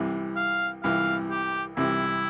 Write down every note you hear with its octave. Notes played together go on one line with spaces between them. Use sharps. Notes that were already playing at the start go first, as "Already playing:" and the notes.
Already playing: C2 C3 E3
F5
C2 C3 E3 F5
G4
C2 C3 E3 E4